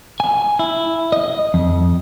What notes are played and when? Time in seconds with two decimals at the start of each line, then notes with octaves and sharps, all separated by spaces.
0.20 G#5
0.59 E4
1.12 D#5
1.54 F2